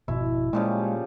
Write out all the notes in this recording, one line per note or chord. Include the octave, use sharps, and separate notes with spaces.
G#1 F2 B2 E4
A#2 C#3 F3 G3 G#3